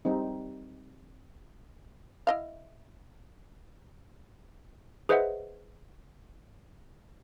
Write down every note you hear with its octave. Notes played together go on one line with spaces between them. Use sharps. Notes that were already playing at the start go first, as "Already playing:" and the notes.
G3 C4 D#4
E4 D#5 F5
G#4 B4 C5 D#5 E5 F#5